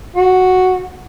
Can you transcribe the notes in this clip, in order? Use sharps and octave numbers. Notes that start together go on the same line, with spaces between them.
F#4